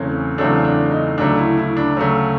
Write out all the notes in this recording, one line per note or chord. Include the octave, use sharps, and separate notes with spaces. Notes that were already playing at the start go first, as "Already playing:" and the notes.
Already playing: E2 C#3 F#3 A3 C4 C#4
E2 C#3 F#3 A3 C4 D4
D4
D#4
D2 C#3 F#3 A3 D4
E4
E4
D4
D2 C#3 F#3 A3 C#4